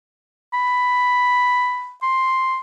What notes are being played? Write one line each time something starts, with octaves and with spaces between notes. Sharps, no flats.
B5
C6